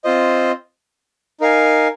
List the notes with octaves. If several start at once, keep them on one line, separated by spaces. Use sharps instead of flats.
C4 F4 C5 D#5
D#4 A#4 F5 G#5